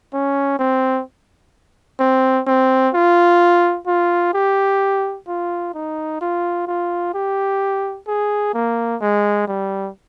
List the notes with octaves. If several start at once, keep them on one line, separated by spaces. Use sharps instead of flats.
C#4
C4
C4
C4
F4
F4
G4
F4
D#4
F4
F4
G4
G#4
A#3
G#3
G3